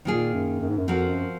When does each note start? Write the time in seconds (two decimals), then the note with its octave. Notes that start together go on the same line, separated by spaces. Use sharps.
0.05 A#2 D#3 A#3 F4 G#4
0.34 F#2
0.60 F#2
0.69 G#2
0.78 F#2
0.88 F2 F3 C4 F#4 A#4
1.09 F#2